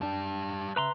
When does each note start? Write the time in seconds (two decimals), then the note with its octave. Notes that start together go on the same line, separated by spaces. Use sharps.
0.01 F#2 G3 D4 G5 A5
0.76 C#3 B4 E5 A#5 C6